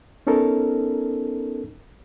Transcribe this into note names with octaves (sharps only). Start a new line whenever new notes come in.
B3 C#4 D#4 A4 A#4